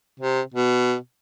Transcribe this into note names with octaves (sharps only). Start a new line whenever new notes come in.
C3
B2